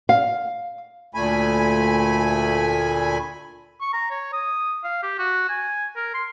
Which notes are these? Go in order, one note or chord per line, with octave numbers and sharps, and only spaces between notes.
F5
D2 A#2 A3 G#5 B5
C#6
A#5
C#5
D#6
F5
G4
F#4
G#5
A#4
C6